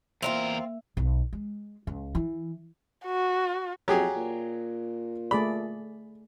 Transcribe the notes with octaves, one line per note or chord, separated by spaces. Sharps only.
E2 A#3 C4 D#4 F4 A#4 E5
B1
G#3
C#2
E3
F#4
F2 F#3 G4 G#4
A#2
A3 G#4 D5 B5